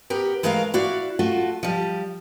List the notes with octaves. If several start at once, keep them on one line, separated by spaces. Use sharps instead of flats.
B3 G4 A#4
E3 G#3 A3 A#4 B4 F5
E4 F#4 D5 F5
A3 F4 F#4
F3 G3